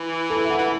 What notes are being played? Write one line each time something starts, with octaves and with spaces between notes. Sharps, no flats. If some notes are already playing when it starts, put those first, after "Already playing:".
Already playing: E3
A4
E5
F#5
E3